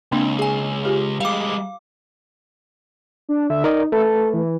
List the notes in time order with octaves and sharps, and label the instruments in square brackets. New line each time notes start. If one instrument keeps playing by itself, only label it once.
[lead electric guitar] C#2 [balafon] A#3 C4 D4
[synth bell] G#4 G#5
[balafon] F4 G4
[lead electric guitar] G3 G#3 [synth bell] F5 D6
[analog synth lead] D4
[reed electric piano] D3 [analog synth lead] E5
[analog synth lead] D#4 [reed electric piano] A#4 D5 D#5
[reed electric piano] A3 B4 [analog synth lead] A4
[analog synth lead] A4
E3